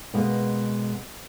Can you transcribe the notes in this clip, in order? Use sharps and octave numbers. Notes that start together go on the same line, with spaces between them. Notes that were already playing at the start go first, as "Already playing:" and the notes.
B2 G#3 A#3